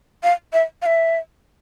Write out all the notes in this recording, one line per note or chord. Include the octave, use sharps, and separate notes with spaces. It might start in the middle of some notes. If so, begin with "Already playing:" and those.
F5
E5
F5
E5